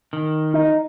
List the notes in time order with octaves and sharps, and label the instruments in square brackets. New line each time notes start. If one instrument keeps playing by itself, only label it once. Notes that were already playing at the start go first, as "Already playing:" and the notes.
[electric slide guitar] D#3
[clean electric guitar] D#4